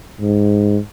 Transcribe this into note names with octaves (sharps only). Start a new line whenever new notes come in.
G#2